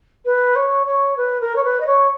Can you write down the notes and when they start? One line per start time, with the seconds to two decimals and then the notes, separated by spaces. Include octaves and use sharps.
0.25 B4
0.55 C#5
0.86 C#5
1.17 B4
1.40 A#4
1.55 C#5
1.64 B4
1.80 D#5
1.86 C#5